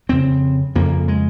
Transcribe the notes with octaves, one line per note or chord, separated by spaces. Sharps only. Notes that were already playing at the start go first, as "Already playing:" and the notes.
F2 C#3 C4
F2 C#3 A#3
G#3